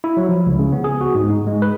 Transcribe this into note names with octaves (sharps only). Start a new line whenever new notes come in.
E4
F#3
F3
C#2
C#3
B3
G#4
F#4
G#2
D#4
G#3
B4